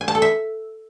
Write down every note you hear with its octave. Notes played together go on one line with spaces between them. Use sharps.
G#5
A5
A4
E5